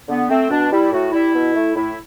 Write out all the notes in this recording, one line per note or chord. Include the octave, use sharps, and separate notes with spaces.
D3 B3
A3 C4
B2 D4
G3 E4
A2 F#4
G3 E4
B2
A3
A2 E4